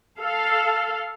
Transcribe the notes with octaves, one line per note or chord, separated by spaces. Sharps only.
A4 F5